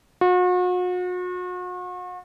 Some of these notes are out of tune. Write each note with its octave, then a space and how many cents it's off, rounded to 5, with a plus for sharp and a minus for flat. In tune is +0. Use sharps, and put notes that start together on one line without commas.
F#4 -40